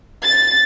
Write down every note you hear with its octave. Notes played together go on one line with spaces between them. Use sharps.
A6